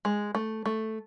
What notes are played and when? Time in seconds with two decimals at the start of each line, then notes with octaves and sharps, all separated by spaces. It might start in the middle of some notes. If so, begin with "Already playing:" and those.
0.05 G#3
0.35 A3
0.65 A3